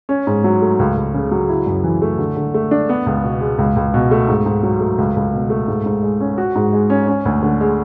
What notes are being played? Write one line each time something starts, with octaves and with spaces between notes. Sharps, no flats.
C#4
G#2
F#3
A3
C#2
C#2
C#3
F#3
E4
F#2
E3
A3
D3
D3
A3
D4
B3
C#2
B2
G#3
C#2
C#2
B2
A3
G#2
G#2
F#3
A3
C#2
C#2
B2
A3
G#2
G#2
G#3
C#4
F#4
G#2
G#3
C#4
C#4
D2
D3
G#3